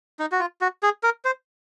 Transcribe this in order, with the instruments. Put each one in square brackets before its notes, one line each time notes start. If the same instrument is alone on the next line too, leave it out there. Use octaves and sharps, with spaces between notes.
[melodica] D#4
F#4
F4
F#4
G#4
A#4
C5